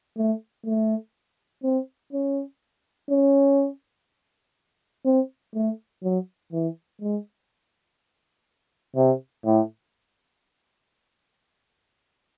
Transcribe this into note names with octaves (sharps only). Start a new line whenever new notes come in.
A3
A3
C4
C#4
C#4
C4
A3
F#3
E3
G#3
C3
A2